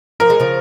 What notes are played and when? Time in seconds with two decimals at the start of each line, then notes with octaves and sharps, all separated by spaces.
0.20 F3 A#4
0.30 G#3
0.40 C#3 F3